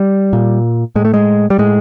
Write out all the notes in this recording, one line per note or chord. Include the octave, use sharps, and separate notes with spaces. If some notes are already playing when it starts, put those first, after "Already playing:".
Already playing: G3
A#2
A2 G#3
A3
G#3
G3
A2 G#3